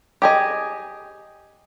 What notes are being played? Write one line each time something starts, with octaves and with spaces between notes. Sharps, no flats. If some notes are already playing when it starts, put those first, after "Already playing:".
G4 G#4 D#5